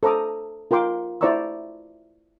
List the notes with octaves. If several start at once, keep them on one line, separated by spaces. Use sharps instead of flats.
A4 C5 A#5 D6 D#6
F4 A#4 G5 C6 D6
E4 C5 D5 A#5 C#6 E6